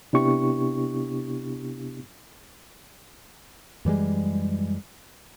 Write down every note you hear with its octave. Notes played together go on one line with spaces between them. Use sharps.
C3 B3 D4 E4 G4 C#6
F#2 E3 G3 G#3